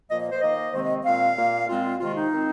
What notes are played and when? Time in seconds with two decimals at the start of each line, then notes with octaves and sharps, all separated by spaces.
0.09 A#2 F3 A#3 D#5
0.20 D#5
0.31 C5
0.41 D#3 A#3 D#5
0.73 C3 D#3 G#3 C4 C5
0.84 D#5
1.04 A#2 G#3 C4 F5
1.36 A#2 A#3
1.68 A#2 G#3 C4 F4
1.99 C3 D#3 G#3 F4
2.15 D#4
2.32 D#3 C4